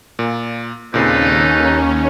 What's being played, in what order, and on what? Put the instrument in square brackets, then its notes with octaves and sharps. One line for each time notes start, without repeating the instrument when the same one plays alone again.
[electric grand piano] A#2
[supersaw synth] D#2 C#4 [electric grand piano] A#2 C#3 C4 [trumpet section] D#4 A4 B4
[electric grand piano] A#5